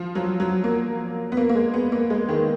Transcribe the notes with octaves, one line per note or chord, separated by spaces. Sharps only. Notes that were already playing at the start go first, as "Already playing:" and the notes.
Already playing: F3
F#3
F#3
A#3
B3
A#3
A#3
G#3
B3
A#3
G#3
D#3